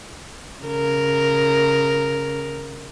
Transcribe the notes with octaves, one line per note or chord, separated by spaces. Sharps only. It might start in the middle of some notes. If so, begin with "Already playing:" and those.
C#3 A#4